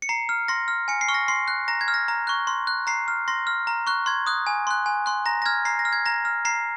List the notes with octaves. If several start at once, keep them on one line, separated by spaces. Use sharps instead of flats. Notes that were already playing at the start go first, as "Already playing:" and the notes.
C#7
A#5 C7
F6
C6 A#6
F6
G#5 C#7
C7
C#6 F6
A#6
C6 C7
F#6
A#5 A#6
G#6
F6
A#6
A#5
C#6 F#6
C6
F#6
A#5 C7
F6
C6 A#6
F6
A#5
C#6 F#6
C6 G#6
D#6 F#6
G#5
C6 F#6
G#5
C6 F#6
A#5 A#6
A#6
F6 G#6
A#5 C7
A#6
F6
G#6
A#5 A#6
F6
A#5 C7